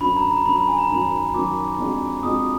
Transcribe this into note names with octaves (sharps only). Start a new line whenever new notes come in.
F#2 D3 F#3 B5
A#5
A#5
F#2 D3 F#3 B5
B5
G#5
A#5
F#2 D#3 F#3 B5
F#2 D#3 F#3 D6
F2 F3 G#3 D4 F#4
F2 F3 G#3 D4 F#4 D#6